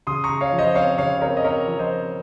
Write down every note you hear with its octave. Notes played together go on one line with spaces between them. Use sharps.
C#3 C6 D#6
A#5 C#6
C#3
C#5 F5
F3
C5 D#5
C4 C#5 F5
C#3 C#5 F5
C4 A#4 C#5
D#5
C4 A#4 C#5
F3
C5 D#5
C4